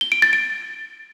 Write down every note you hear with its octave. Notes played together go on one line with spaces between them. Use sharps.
G7
D7
A6
D7